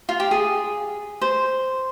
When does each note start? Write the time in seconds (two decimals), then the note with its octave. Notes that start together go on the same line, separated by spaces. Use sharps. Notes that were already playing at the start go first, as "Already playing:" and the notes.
0.09 F4
0.20 G4
0.31 G#4
1.21 C5